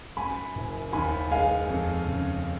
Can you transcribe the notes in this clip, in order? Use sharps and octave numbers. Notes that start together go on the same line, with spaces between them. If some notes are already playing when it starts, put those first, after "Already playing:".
F#2 G#5 B5
F#1
D#2 G#5 B5
G#3 F5 G#5
F2
C#3